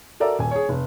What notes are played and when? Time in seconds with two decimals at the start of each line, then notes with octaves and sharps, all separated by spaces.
0.20 F#4 A4 A#4 D5 E5
0.39 D#1 G#5
0.51 G#4 C#5
0.69 F1